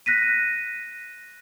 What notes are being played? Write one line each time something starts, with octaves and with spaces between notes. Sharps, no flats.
F#6 A#6 B6 D#7